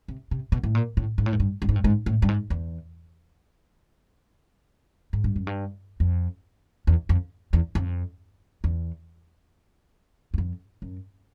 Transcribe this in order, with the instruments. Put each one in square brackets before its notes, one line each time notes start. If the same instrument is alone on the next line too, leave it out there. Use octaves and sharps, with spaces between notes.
[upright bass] C3
C3
B2
A2
A#2
A2
G#2
A2
G#2
G2
G2
G#2
G2
G#2
A2
G2
G#2
E2
G#2
G2
F#2
G2
F2
E2
F2
E2
F2
E2
F#2
F2
F#2